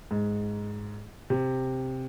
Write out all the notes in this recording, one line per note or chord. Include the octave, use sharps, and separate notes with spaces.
G#2
C3